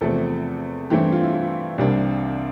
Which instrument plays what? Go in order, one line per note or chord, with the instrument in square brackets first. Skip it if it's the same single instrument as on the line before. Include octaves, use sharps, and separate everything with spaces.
[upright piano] E2 C3 F3 A3 A4
G2 E3 A3 C4 G4
F4
E4
F4
C2 C3 G3 A#3 D4